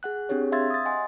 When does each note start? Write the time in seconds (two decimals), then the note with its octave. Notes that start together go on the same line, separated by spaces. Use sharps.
0.03 G#4 F#5 F#6
0.29 C4 D4 G4 G#4 C#5
0.52 E5 F5 C6 E6 G#6 A6
0.70 D#6 A6
0.85 D#5 F#5 G#5 C6